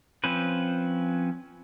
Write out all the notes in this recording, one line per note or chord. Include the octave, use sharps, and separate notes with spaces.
F3 C4 C#4 B4